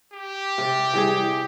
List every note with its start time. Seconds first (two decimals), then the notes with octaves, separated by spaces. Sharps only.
0.13 G4
0.58 C3 D5
0.93 E3 G3 G#4